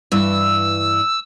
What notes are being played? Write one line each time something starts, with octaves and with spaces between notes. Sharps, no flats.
G2 E3 E6